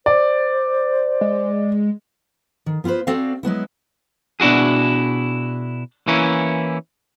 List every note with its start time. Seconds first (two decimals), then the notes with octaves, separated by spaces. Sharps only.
0.06 C5 D5
1.21 G#3
2.66 D#3
2.84 B3 F4 G4 B4 C5
3.07 C4 F#4 A4 D5 F5
3.43 F#3 G#3 B3 E4
4.40 B2 D4 E4 F#4 G#4
6.08 E3 A#3 C#4 E4